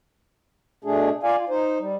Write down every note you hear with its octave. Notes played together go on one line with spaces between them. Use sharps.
B2 A3 D4 G#4
F4 D5 F5 G#5
F4
D#4 C5
G3